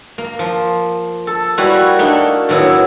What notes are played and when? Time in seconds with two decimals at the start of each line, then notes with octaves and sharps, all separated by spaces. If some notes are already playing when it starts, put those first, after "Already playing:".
0.18 A#3
0.39 F3
1.27 A4
1.58 G3 A#3 E4 F#4 B4 C#5
1.99 A3 A#3 D4 D#4
2.49 A2 D#3 F#3 B3 E4